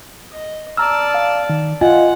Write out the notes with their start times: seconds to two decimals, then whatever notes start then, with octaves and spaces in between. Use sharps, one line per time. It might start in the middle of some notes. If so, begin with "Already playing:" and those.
0.32 D#5
0.77 D5 A5 A#5 E6 F6
1.14 F5
1.50 D#3
1.81 F4 D#5 F#5 G#5